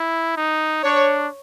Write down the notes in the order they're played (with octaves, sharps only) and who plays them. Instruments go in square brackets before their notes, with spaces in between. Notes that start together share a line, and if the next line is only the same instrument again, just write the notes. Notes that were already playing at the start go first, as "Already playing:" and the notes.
Already playing: [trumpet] E4
D#4
[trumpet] D4 [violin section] C#5